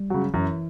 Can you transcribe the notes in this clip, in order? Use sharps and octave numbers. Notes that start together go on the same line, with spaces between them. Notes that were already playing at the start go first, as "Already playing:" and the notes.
Already playing: G3
C#3 F#3
F#2 E3